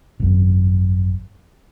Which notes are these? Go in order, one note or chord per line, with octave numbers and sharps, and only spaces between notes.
G#1 F#2